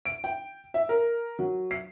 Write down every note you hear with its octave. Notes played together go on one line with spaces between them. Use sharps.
D7
G5
E5
A#4
F#3
C7